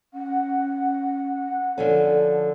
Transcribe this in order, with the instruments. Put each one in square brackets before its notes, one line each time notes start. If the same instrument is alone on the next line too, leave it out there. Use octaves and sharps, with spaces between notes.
[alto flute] C#4 [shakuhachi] F#5
[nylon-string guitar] D3 F3 C#4 [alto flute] A4